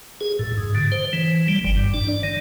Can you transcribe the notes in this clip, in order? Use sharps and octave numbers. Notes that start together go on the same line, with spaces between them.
G#4
A2
G#2
D3
C5
E3
G3
G1
G2
D4
D5
D#3